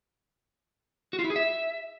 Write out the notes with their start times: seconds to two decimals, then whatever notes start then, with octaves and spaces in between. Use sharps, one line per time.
1.13 F#4
1.19 F4
1.24 E4
1.30 G#4
1.36 E5